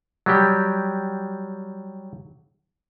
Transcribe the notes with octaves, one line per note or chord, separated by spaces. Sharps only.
F#3 G3 G4